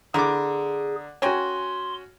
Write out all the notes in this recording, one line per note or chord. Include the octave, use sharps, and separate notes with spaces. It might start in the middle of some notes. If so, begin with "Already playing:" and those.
D3 B3 E4 G#4 A#4 D6
C#4 F#4 A#4 G5 G#5 C6